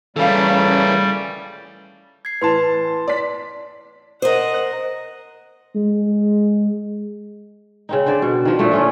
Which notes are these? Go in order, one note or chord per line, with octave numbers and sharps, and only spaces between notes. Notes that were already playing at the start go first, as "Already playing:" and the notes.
A#2 C#3 E3 G3 A3 A4 F5
G#6 C7
A2 E3 B4 A5 C6
D5 B6
A#4 C5 D#5 F#5
G#3
C#3 C4 D#4
D3 C5 D5
B2
D#3 F3 F4
A#2 D3 A3
F3 C#4 F4